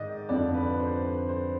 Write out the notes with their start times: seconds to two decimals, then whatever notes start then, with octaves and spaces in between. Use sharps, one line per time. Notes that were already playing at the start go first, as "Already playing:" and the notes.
Already playing: G#2 D#3 D5 D#5
0.29 F2 D3 F3 D5
0.54 B4
0.79 C5
1.04 C5
1.29 C5